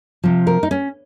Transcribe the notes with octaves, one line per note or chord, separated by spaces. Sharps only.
C3 F3
A#4
D#4
C#4